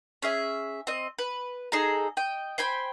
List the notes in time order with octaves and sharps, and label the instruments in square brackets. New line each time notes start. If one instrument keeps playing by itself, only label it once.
[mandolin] C#4 G#4 E5
C4 D#5
B4
D#4 G#4 A4 A#5
D#5 G5
C5 G5 G#5 B5